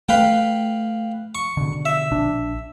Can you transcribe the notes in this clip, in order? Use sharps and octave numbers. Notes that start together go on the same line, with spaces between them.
A3 B4 F5 G5
C#6
B2 D3
E5
A#1 D4